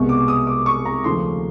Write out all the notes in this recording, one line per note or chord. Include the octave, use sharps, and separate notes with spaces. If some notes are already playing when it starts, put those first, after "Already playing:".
Already playing: C2 B2 G#3 B3 C#6
D6
D#6
D6
C#6
A#5
D#2 C#3 F3 A3 C6